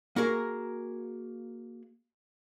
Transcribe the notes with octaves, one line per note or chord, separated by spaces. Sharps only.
A#3 F#4 G#4 A#4